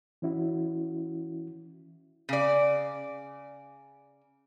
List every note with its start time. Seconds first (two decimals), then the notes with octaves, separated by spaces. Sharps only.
0.22 E3 C#4 E4 F#4
2.29 C#3 D5